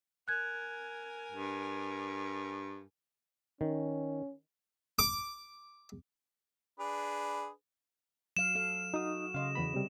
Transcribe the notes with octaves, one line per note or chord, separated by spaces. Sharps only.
A#4 G#5 F#6 G#6
G2
D#3 C#4
D6
D4 G#4 B4
F#3 F5 E7
A4 F5
D#4 F#4 D#6
C#3 D#5 F5 C6
E2 B3 B5
C3 G3